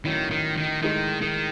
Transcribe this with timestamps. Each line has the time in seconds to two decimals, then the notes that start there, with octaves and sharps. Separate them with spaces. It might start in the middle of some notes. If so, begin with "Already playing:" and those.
0.05 A2 D#3 F#3 C#4 E4
0.31 D#3
0.57 D#3
0.82 A2 D#3 G#3 D#4
1.22 D#3